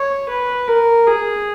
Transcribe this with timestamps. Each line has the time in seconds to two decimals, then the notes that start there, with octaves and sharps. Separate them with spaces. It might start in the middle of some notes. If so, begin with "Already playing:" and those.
Already playing: C#5
0.29 B4
0.68 A#4
1.07 G#4